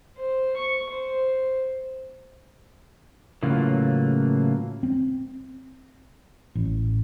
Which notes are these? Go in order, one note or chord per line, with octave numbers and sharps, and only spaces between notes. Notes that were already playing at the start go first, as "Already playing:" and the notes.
C5
C#6
C5
A2 C#3 E3 F#3 A#3 F4
C4
A1